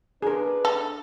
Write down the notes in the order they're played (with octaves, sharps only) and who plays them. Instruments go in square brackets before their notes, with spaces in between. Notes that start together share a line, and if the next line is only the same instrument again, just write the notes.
[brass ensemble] D4 B4 [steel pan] G#4 A#4
[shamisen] A4 [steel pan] A5